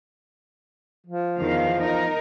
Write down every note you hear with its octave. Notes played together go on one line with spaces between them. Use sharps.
F3
E2 D#3 F5
D#4 A#4